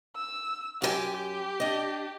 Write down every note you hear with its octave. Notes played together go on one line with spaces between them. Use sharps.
E6
F#2 F#4 G4 G#5
G4
D4 D#5